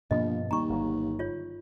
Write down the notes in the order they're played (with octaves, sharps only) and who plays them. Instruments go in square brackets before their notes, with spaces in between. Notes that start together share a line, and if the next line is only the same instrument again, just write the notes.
[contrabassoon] A#1 [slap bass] G2 B2 F3 [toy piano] D#5
[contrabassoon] D#2 [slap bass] G3 A#3 [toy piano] A#5 C#6
[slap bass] G1 F#3
[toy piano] F4 C#5